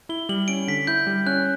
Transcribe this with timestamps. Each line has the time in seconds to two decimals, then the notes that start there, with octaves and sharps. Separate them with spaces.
0.09 E4 G7
0.29 G3 F#7
0.48 C#4 D7
0.67 D3 B6
0.87 E4 G6
1.07 G3
1.26 C#4 F#6